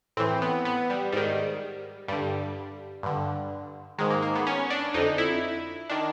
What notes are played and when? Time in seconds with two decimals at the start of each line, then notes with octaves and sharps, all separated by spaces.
0.17 A2 E3 C4
0.42 B3
0.65 B3
0.90 G3
1.12 G#2 D#3 G3
2.08 G2 D3 G3
3.03 G2 D3
3.98 G#2 D#3 G#3
4.10 A#3
4.22 A#3
4.35 B3
4.47 C#4
4.70 D4
4.94 F2 D3 D#4
5.18 E4
5.90 D#3 D4